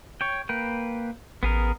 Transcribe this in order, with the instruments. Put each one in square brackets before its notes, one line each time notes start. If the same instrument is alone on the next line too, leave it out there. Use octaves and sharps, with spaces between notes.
[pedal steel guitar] C#5 G5
A#3 B4 G5
[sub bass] A1 [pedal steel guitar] B3 G#4 A#4